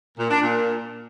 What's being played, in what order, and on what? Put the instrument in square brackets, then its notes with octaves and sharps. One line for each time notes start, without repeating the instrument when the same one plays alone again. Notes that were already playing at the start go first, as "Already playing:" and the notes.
[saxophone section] A#2
D4
A#2